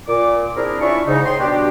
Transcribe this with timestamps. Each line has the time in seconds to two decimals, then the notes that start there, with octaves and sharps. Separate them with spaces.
0.07 A#2 D6
0.56 C4 D4 E4 G#4 A#4
0.80 C#4 D4 E4 F4 E5 C#6
1.06 G#2 C#3 D#4
1.25 C5 C#5 G5 C6
1.39 B2 G3 D4 F#4 G4